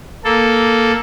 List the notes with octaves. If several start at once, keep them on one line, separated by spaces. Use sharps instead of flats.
A#3 A4